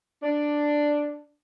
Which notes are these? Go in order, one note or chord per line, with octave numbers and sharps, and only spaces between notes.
D4